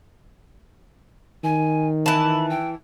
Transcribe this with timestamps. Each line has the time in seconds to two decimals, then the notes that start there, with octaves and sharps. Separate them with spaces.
1.44 D#3 G#5
2.06 E3 A5 B5
2.50 G5